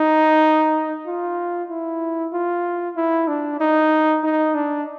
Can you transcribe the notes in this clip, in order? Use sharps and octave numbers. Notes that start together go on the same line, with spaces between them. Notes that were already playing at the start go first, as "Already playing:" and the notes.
Already playing: D#4
F4
E4
F4
E4
D4
D#4
D#4
D4